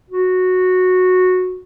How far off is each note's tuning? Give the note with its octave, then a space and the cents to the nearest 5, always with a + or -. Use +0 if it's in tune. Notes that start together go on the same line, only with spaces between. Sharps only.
F#4 -10